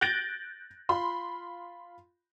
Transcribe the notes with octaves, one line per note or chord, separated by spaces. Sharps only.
F#6 G6 A6 A#6 D7 F#7
F4 B5 C6